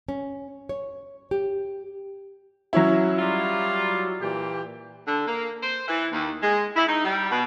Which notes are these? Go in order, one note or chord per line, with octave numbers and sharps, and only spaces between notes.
C#4
C#5
G4
F#3 C#4 E4
G3 F4
A#2 E3 G4
D3
A#3
C5
E3
D#2
G#3
E4
D#4
G3
B2